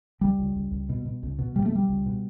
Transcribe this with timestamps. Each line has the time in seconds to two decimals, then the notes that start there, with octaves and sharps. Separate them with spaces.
0.21 C#2 G3
0.39 C#2
0.55 C#2
0.71 C#2
0.89 B2
1.05 B2
1.23 C#2
1.39 B2
1.56 B2 G3
1.66 A3
1.72 B2 G3
1.89 C#2
2.06 B2